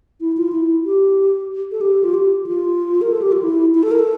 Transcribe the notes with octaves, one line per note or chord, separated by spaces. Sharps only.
E4
F4
E4
G4
A4
G4
F4
G4
F4
A#4
A4
G4
F4
E4
E4
A4
A#4
A4